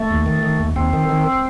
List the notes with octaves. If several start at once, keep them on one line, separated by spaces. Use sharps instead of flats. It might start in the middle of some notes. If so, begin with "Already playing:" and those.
Already playing: A3
D#2
D#3
D#3
D#2
D#2 C4
D#3
D#3